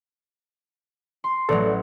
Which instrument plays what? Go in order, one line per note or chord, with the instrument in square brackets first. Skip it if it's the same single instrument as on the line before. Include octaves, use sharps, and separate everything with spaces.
[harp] C6
[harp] A1 F#3 [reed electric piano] A4 D5